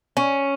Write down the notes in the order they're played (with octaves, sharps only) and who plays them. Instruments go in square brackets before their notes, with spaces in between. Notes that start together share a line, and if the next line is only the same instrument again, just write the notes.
[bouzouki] C#4